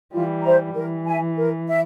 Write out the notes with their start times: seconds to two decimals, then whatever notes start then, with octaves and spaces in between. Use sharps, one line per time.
0.13 E3 G3 F4
0.44 C5 E5 A#5
0.75 E3 A#4
1.06 E5 G#5
1.38 A#4
1.68 E5